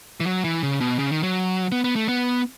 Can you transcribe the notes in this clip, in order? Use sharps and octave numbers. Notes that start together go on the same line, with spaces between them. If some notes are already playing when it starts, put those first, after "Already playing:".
E3
F#3
E3
C#3
B2
C#3
D#3
F#3
B3
B3
A3
B3